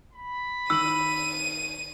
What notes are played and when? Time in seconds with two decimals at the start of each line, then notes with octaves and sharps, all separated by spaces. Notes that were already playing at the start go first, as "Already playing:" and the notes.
0.13 B5
0.70 D#3 E6 D#7 F#7